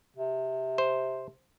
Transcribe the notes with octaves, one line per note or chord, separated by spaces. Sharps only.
C3
C5